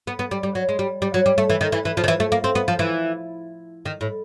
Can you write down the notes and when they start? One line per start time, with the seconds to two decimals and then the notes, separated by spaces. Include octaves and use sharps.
0.07 B3
0.19 B3
0.31 G3
0.43 G3
0.55 F#3
0.69 G#3
0.79 G3
1.02 G3
1.14 F#3
1.26 G3
1.38 A3
1.50 E3
1.61 D#3
1.72 E3
1.85 E3
1.97 F3
2.04 D#3
2.08 E3
2.20 A3
2.32 A#3
2.44 C4
2.55 B3
2.68 F3
2.79 E3
3.86 D#3
4.01 A2